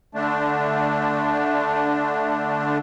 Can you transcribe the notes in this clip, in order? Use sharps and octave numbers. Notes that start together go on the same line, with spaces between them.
D3 A3 D4